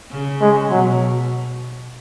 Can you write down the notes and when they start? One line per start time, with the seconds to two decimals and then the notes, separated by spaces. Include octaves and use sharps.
0.11 C#3
0.41 G#3
0.70 B2 F#3